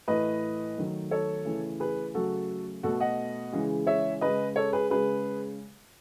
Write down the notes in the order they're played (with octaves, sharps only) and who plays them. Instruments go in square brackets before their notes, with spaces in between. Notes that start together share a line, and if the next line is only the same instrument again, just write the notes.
[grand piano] A2 E3 A3 B4 D#5
D#3 F#3 A3
A4 C#5
C#3 E3 A3
G#4 B4
C#3 F#3 A3 F#4 A4
B2 A3 F#4 A4
D#5 F#5
C#3 E3 G#3
C#5 E5
C#3 G#3 B4 D#5
A4 C#5
G#4 B4
C#3 G#3 G#4 B4